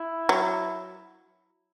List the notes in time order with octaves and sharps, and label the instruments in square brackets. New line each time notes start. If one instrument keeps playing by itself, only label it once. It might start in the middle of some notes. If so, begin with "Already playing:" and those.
Already playing: [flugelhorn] E4
[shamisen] F#3